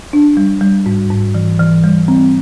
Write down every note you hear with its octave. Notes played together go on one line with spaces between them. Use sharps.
D4
G3
G3
G#2
G#2
E3
E3
G3
C4